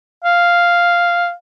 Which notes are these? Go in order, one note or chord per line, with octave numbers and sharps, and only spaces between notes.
F5